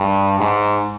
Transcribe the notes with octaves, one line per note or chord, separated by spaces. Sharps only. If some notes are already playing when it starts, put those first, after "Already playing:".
Already playing: G2
G#2